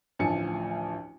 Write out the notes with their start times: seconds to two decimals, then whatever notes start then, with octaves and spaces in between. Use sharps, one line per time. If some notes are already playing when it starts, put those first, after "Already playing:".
0.19 A1 D2 F3 G#5 A5 C#7